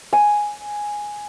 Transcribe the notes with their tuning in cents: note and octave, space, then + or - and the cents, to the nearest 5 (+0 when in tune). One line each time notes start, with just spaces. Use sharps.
G#5 +0